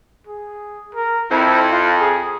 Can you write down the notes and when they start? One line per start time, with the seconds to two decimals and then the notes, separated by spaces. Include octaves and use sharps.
0.27 G#4
0.94 A#4
1.31 F2 E4
1.71 F4
2.00 G#4